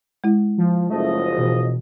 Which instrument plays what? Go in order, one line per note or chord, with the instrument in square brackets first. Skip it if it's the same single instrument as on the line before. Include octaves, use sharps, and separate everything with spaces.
[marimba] G#3 E4
[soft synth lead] F3
[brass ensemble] F#1 F3 D#5 [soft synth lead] A3
[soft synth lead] B2 [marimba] E3